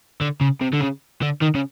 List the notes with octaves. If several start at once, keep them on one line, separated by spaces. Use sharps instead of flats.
D3
C#3
C3
D3
C#3
D3
D#3
C#3